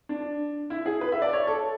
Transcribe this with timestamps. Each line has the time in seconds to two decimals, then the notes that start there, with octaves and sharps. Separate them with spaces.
0.09 D4
0.70 E4
0.86 G#4
1.01 B4
1.12 E5
1.22 D5
1.33 C#5
1.47 A4